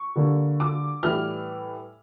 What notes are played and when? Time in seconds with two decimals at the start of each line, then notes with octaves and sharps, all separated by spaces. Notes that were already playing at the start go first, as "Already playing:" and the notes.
Already playing: C#6
0.16 D3 G3 A#3
0.60 D6
1.03 A2 E3 G3 F6